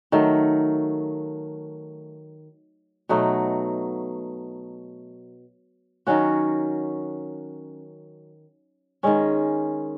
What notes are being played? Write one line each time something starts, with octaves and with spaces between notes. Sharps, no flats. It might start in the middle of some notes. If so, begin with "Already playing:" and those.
D#3 F#3 A3
B2 F#3 A3 D#4
D#3 F#3 C#4 F#4
D#3 G#3 C#4